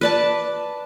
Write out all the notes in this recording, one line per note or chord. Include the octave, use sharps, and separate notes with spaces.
B4 D5 A5